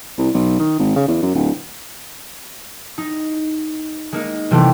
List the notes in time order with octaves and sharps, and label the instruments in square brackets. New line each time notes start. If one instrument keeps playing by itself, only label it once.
[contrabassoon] C2
B1
D#3
G#1
C#3
E2
F#2
D1
[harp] D#4
G#3 A#3 D#4
C3 E3 G3 A3 B3 C4